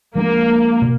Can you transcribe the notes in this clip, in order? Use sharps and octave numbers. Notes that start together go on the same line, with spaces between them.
F3 G#3 A#3 D4
B2